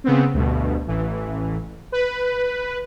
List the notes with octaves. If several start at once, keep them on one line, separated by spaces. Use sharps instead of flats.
C#3 B3 C4
D2 G2 B2
A1 E3
B4